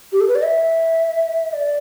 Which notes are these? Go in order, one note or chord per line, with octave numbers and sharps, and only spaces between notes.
G4
A4
B4
D5
E5
D5